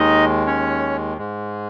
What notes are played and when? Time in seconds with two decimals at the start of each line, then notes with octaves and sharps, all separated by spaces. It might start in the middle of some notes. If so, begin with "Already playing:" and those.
Already playing: D#2 D#3 G#3 D#4 D#5
0.47 C#4 C#5
1.17 G#2 G#3